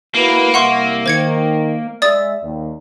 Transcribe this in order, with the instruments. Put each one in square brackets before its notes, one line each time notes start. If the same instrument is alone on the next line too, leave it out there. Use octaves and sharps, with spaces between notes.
[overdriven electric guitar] A#3 [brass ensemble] E4 F#4 B4
[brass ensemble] C2 E5 [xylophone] F#5 C6 C#6
[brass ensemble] D#3 [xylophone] C5 G#6 C#7
[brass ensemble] G#3 E5 [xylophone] D5 D#6 A6
[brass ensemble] D#2